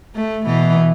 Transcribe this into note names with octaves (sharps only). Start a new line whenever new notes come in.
A3
B2 E3